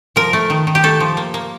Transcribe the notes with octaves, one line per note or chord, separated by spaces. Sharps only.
F3 A#4
A3
D#3
D#3
G4
A3 A4
F3
A#3
A#3